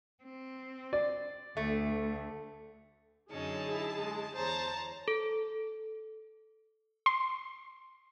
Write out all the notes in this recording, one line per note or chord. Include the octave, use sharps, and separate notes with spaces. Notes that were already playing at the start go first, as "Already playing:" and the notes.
C4
D5
D2 A3
F#2 D3 C#4 D#4 G#4 A5
E4
G#3
E2 C5 C#5 A5 A#5
A4
C6